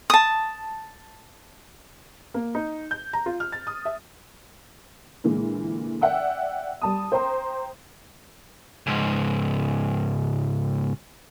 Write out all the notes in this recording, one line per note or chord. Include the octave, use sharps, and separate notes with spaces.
A5 D#6
A#3
D#4
G6
A#5
F4
F6
A6
D#6
E5
A#2 D3 E3 G#3
D5 E5 F#5 G5 E6
G3 A5 D#6
C5 G5 A#5 C6
C#2 G#2